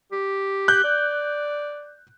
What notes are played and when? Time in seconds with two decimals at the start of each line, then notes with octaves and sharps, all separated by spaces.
0.12 G4
0.68 F#6 G6
0.84 D5